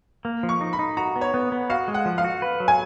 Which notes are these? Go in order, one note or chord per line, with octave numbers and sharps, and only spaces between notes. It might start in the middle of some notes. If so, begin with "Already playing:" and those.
A#3
F3
C#6
D#4
B5
D#4
F#4 A#5
B3
C#5
B3
B3
F#4 F5
G#3
F#5
F3
F5
F#4
B4
F#3
G#5